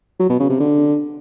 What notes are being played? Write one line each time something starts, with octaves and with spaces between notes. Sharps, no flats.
F#3
B2
C#3
C3
D3